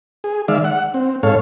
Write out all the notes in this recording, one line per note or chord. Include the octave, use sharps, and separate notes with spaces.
G#4
D#3 G#3 D5 E5 F5
F#5
C4
G#2 A4 C#5 F5